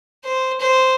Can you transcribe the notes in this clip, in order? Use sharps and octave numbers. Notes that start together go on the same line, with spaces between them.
C5
C5